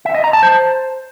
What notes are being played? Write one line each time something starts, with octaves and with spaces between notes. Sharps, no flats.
E5
D#5
A#5
A5
C5